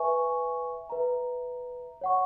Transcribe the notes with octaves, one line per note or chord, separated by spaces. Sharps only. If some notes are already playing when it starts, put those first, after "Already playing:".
Already playing: B4 E5 G#5 C#6
B4 E5 A#5
C#5 F#5 C#6